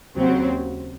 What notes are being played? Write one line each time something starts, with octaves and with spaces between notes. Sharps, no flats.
D#2 C#3 F#3 C4